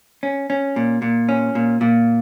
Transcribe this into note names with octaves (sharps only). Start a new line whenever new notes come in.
C#4
C#4
A#2
A#2
C#4
A#2
A#2